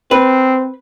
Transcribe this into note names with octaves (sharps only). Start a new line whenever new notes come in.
C4 B4